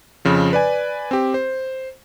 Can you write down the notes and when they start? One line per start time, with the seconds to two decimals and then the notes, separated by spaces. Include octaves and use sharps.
0.25 F2 C#3 F3
0.53 B4 D5 G#5
1.11 C4 G4
1.34 C5